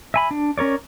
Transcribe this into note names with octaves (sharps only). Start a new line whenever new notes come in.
E5 G#5 B5
D4
C#4 A#4 C#5 D5